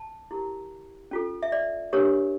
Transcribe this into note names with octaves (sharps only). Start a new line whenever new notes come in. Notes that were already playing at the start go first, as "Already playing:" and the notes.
Already playing: A5
E4 G4 A#4
C#4 F4 A4
E5
D5
D4 G4 A#4 C#5